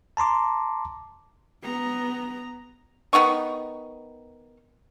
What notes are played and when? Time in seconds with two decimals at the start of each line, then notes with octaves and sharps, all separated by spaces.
0.17 A5 A#5 C6 D6
1.63 B3 A#5
3.13 D#3 B3 D#4 C#6